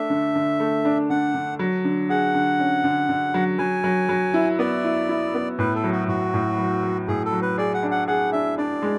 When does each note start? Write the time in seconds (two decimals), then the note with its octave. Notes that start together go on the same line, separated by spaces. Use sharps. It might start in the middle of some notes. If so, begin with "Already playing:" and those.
Already playing: A3 D4 E5
0.10 D3
0.35 D3
0.60 A3
0.85 D4
1.10 D3 F#5
1.35 D3
1.59 F#3
1.85 D3
2.09 G#4 F#5
2.34 D3
2.59 C#4
2.84 D3
3.09 D3
3.34 F#3
3.59 F#3 G#5
3.84 F#3
4.09 F#3
4.34 E4
4.59 B3 D5
4.84 E4
5.09 E4
5.34 B3
5.59 A2 B4
5.75 A4
5.84 F#3
5.92 F#4
6.08 A2 F#4
6.34 A2
6.58 F#3
6.83 F#3
7.08 A2 G#4
7.25 A4
7.33 F#3
7.42 B4
7.58 G#4 D5
7.74 F#5
7.83 D4
7.91 F#5
8.08 G#4 F#5
8.32 D4 E5
8.58 D4 D5
8.82 G#3